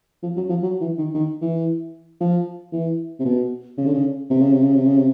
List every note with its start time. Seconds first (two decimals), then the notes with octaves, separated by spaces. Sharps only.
0.23 F3
0.36 F#3
0.49 F3
0.63 F#3
0.81 E3
0.98 D#3
1.14 D#3
1.42 E3
2.20 F3
2.72 E3
3.19 C3
3.25 B2
3.77 C#3
3.86 D3
3.94 C#3
4.30 C3
4.41 C#3
4.53 C3
4.63 C#3
4.75 C3
4.86 C#3
4.98 C3